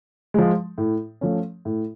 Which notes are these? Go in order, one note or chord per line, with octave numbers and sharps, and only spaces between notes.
F3 G#3
A2
F3 A3 C#4
A2